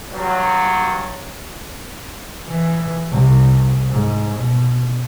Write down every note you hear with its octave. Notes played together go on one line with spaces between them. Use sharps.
G2 F#3
E3
C2
G#2
B2